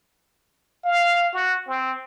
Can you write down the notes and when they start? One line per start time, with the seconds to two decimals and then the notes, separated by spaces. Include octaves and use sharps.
0.85 F5
1.34 F#4
1.68 C4